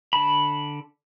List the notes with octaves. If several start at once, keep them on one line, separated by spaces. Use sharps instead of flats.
D3 A5 B5